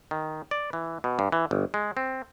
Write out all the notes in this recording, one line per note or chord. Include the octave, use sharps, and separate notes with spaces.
D#3
D5
E3
B2
G2
E3
G1
G#3
C4